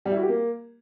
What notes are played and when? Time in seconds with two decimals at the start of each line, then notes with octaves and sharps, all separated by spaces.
0.05 G3
0.11 E4
0.17 F#4
0.23 G4
0.29 A#3